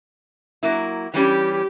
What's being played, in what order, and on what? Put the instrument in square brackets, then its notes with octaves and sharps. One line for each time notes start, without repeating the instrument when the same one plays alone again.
[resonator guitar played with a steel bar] F#3 A#3 E4
[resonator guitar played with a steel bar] E3 G3 C#4 [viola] G4